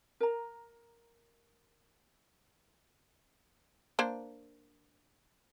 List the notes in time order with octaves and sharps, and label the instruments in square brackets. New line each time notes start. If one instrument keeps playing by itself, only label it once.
[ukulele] A#4 A#5
[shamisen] A#3 D4 C5